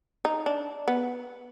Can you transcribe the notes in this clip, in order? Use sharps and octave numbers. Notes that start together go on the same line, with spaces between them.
D#4
D4
B3